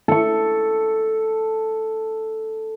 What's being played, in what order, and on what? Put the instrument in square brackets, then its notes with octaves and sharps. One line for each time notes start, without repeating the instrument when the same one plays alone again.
[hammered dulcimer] A4 C#6